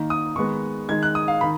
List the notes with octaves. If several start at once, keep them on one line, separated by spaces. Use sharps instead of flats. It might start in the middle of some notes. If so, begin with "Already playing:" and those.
Already playing: D#3 A#3 D#4
D#6
D#3 G#3 B3 C#6
D#3 G#3 D#4 G#6
F#6
D#6
F5
D#3 D#4 B5